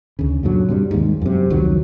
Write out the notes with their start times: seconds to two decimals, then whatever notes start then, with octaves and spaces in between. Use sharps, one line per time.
0.19 D2 C#3
0.43 F#2 A#2 D3 F#3
0.69 G2 C3 G3
0.91 D#2 G#2
1.22 F#2 C3
1.50 F1 C#2 D#3 F#3